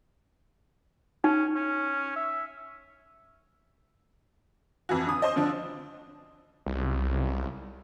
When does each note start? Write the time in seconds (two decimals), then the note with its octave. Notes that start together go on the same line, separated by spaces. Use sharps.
1.24 C#4 D#4
1.56 C#4
2.16 E5
4.89 F2 E3 F#4
5.06 D3 D#6
5.22 C5 D#5
5.36 D3 F3 D4
6.66 C2